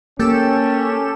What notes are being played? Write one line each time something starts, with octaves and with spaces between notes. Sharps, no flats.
A#3 C#4 G4 A4 E7